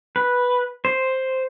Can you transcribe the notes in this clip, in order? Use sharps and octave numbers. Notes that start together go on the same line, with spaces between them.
B4
C5